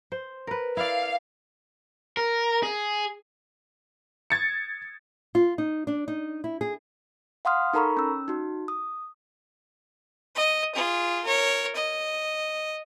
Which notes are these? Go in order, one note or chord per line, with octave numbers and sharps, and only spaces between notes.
C5
A#4 B4
E4 D5 F5
A#4
G#4
G#6 A6 C#7
F4
D#4
D4
D#4
E4
G#4
F5 F#5 C6 D#6 F6
D#4 A4 A#4 A#5 B5 C#6
C#4 E6
D#4 F#4
D#6
D#5
F4 G#4
A#4 C#5
D#5